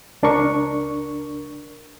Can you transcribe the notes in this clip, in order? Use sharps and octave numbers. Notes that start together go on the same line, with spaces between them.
C#2 D4 A#4 C#6